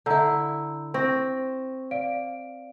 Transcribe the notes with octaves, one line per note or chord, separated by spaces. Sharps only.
D3 E4 A#5 E6 G6
C4 C#6 A#6
D5 F5 D7